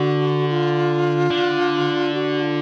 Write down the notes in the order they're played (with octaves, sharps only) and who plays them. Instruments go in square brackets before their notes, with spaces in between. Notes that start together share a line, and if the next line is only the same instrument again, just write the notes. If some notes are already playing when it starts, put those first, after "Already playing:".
Already playing: [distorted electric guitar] D3 [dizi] F#4
[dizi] F#4
F4
[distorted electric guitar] D3
[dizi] F#4
F4